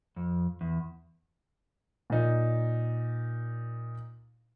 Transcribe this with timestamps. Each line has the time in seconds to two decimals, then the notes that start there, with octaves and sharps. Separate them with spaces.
0.16 F2
0.61 E2
2.10 A#2 D#4